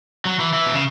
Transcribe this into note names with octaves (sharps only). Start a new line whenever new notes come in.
F#3
E3
E3
B2
C#3